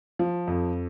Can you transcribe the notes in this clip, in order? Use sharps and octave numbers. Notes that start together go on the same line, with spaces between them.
F3
F2